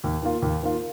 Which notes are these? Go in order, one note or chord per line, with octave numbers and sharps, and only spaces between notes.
D#2
D#3 A#3 F4
D#2
D#3 A#3 F4